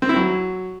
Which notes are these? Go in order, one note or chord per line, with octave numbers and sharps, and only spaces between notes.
C4
E4
F#3